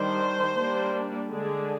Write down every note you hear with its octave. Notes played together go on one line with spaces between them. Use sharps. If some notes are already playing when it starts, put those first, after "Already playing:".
Already playing: D#3 G3 D4 C5
G3 A#3 D4
D3 G#3 D4 G#4